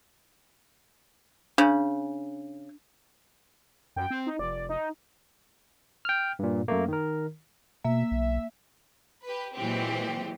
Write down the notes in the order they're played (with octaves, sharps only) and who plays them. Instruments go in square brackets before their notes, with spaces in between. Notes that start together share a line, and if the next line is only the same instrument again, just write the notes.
[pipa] C#3 [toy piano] D4
[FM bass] F#2 [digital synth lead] G5
[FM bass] C4
[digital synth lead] D#4
[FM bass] F1 [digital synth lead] D5
[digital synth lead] D#4
[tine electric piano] G5 F6
G2 A#2
F#2 A3 A#3
D#3 A#4
[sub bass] B2 [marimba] A#3 [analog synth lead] E5
[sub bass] B1
[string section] G4 B4
A#2 E3 F#3 G#3 C4 G4